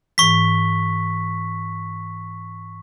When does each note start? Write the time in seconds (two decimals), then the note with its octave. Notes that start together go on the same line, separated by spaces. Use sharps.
0.18 G#2 E3 C#6 B6